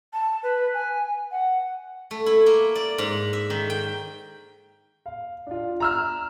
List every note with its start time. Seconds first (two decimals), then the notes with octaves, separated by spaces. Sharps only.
0.13 A5
0.43 B4
0.74 G#5
1.31 F#5
2.11 A3
2.26 E4
2.46 A#3
2.75 D5
2.98 G#2
3.33 E5
3.50 D#3
3.70 G5
5.06 F5
5.47 D4 F4
5.80 A#5 E6 F6